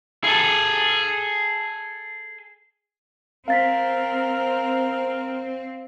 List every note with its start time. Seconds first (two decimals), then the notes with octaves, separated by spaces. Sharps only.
0.24 G#4 A4
3.48 C4 A#4 F5 A6 B6